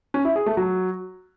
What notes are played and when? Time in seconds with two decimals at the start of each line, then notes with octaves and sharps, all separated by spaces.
0.14 C#4
0.25 E4
0.36 G#4
0.46 A3
0.57 F#3